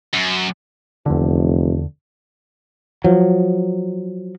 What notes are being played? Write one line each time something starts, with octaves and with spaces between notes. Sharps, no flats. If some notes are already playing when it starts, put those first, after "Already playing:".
F#2
F1 E2 D3
F3 F#3